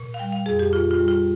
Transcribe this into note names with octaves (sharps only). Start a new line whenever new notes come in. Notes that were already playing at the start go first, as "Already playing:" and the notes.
Already playing: A#2
F5
G3 G5
F5
F2 G#4
G4
A#2 F4
F4
G3
F4